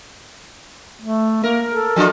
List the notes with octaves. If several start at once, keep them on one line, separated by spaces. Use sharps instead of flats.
A3
A#3 A#4
A4
F3 D4 F4